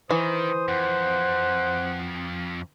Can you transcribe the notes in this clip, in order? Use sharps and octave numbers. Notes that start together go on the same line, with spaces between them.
D#3 E3 C5 D#6
F2 F#5